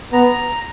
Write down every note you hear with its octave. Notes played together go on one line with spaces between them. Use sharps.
B3 A#5